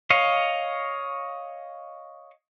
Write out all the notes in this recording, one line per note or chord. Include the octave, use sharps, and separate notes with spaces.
C#5 D#5 F5